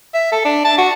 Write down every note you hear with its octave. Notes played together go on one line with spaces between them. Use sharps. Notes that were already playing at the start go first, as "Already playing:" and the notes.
E5
A4
D4
A5
F#4